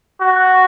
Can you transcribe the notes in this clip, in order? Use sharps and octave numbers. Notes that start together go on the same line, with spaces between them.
F#4